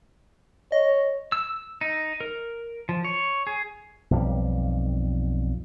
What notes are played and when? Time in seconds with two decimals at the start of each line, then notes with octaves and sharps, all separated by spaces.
0.72 C#5 D#5
1.32 E6
1.81 D#4
2.21 A#4
2.89 F3
3.05 C#5
3.47 G#4
4.11 B1 F2 G3